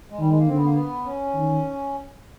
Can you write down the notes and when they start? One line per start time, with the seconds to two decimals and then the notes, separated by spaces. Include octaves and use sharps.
0.10 G#3
0.19 D#3 G3
0.29 G#3
0.39 A#3
0.47 D3 C4
0.57 B3
0.65 A#3
0.74 B3
1.05 C#4
1.34 D#3